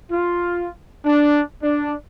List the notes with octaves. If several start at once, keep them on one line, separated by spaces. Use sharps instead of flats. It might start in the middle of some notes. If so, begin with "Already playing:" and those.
F4
D4
D4